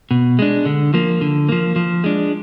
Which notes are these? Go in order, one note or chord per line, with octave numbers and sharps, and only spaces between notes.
B2
G#3 D4
D3
F3 A#3
D3
F3 A#3
F3
G#3 D4